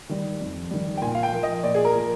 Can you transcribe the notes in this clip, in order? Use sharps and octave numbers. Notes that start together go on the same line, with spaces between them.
D#3 G3
F2
D#3 G3
G5
A#2 G#5
F5
G5
F3 A#3
D#5
A#2 D5
G#4
A#4
F3 A#3